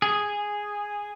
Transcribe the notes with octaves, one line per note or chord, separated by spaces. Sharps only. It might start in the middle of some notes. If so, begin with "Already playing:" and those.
G#4